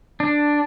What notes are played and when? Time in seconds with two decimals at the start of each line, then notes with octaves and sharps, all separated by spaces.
0.20 D4